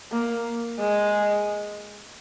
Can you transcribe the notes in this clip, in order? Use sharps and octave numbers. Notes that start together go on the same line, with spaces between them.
A#3
G#3